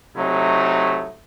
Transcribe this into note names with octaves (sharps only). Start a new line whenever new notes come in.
C3 F#3 A3 D#4 E4